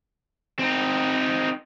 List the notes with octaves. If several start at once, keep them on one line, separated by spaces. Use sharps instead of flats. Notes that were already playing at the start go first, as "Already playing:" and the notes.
C4 D#4